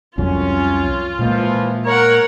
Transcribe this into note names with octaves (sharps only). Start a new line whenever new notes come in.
C2 F2 F#3 C#4 F4
A#2 E3 F3 G#3 A#3
A#4 C#5 F#5